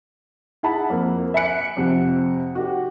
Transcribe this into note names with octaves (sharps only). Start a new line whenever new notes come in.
E4 G#4 F#5 A5 B5
F2 A#3
E5 G#5 B5 F#6 C#7 D7
F2 C3 F#5
F#4 G4